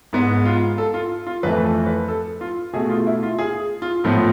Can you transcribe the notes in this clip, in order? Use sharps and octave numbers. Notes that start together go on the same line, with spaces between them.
G#2 G#3 B3
F4
A4
F4
F4
F2 E3 A3 B4
A4
B4
A4
F4
B2 A3 G#4
F4
E4
F4
G#4
F4
A2 F3 B3 F4